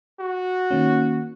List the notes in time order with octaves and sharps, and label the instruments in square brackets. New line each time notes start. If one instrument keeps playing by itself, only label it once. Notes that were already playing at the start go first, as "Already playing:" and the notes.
[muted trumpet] F#4
[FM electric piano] D#3 A#3 C#4